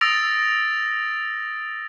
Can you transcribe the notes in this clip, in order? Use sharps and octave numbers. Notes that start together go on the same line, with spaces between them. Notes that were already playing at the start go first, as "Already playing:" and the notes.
D#6 E6 A6 A#6 D7 F7